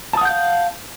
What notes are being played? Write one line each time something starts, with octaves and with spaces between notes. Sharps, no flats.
F5 F#5 A5 D#6 G6